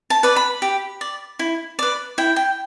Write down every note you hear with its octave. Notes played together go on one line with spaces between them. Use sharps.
A5
B4 D5
B5
G4
D5
E4
B4 D5
E4 G5
G5